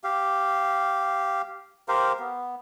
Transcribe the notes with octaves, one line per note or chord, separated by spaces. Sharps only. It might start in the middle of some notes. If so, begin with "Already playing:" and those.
G4 F5
G4 A#4 C5 F5
B3